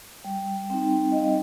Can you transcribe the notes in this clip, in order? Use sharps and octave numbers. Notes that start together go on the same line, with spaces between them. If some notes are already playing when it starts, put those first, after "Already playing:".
G3 G5
C4 D#4 G5
D#5
G3 F5